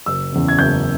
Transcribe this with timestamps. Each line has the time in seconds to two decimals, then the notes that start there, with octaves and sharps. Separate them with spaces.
0.06 F#1 E6
0.33 E2 C#3
0.48 G#6
0.59 F#1 G6